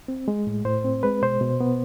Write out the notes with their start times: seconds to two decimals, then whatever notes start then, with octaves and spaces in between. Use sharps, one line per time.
0.08 C4
0.28 G#3
0.47 A2
0.65 A2 C5
0.84 C4
1.03 G#3 B4
1.22 B2 C5
1.41 B2
1.61 B3